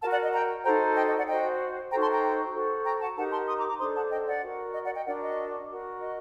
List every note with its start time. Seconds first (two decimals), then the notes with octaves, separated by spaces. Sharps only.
0.02 F#4 A#4 F#5 A5
0.12 D5 F#5
0.23 D#5
0.33 G5 A#5
0.64 D#4 F#4 A4 C5 G5 A#5
0.96 D#5 G5
1.06 D#5
1.17 D5 F#5
1.27 F#4 C5 D#5 G5
1.91 D#4 F#4 A4 C5 G5 A#5
2.01 A5 C6
2.12 G5 A#5
2.54 F#4 A4 C5
2.85 G5 A#5
3.00 F#5 A5
3.17 D#4 G4 A#4 F#5 A5
3.32 A5 C6
3.48 C6 D#6
3.59 A#5 D6
3.69 A#5 D6
3.79 D4 A4 C5 C6 D#6
3.96 F#5 A5
4.11 D#5 G5
4.26 D5 F#5
4.42 F#4 A#4
4.74 D#5
4.85 D5 F#5
4.95 D#5 G5
5.06 D4 F#4 A#4 D5 F#5
5.22 D#5
5.69 F#4 A#4
6.01 D#5